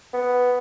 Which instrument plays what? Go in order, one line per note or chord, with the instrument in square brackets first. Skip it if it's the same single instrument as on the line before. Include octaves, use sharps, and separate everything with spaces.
[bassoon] B3